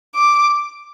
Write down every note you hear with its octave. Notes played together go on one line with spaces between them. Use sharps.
D6